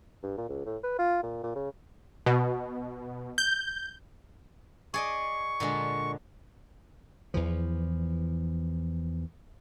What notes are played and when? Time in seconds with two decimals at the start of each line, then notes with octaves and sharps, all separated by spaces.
0.23 G2
0.37 A#2
0.49 C#2
0.66 A2
0.84 B4
0.98 F4
1.23 A#2
1.43 A#2
1.56 C#3
2.26 B2
3.38 G6
4.94 G#4 D5 D#5 C#6
5.60 A#2 D3 G#3
7.34 E2 E3 F3